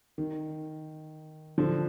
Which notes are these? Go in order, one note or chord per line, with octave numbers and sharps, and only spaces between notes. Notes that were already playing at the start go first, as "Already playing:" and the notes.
D#3
D3 F3